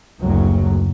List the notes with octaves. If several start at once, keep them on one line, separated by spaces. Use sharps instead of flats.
F#1 D2 F#3